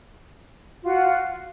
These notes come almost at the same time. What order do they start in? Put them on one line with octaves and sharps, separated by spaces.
F4 F#4 F#5